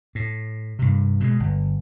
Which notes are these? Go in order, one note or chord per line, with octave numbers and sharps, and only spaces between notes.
A2
G2 C3
B2 G3 G#3
G1